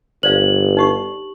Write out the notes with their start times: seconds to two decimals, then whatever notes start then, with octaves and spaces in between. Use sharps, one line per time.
0.23 G1 C5 D5 F5 F#7
0.77 D#4 G4 C#6